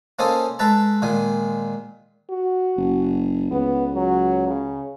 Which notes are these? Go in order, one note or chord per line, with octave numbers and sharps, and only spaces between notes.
A#3 C#4 A4 C5 D#5 G#5
G#3 A4 B4 A5 A#5
A#2 D#3 G#3 G#5
F#4
F#1
C#2 B3
F#3
C#3